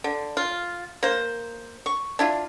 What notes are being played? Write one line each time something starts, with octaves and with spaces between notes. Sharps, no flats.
D3
F4
A#3 C5
C#6
D4 E4 F4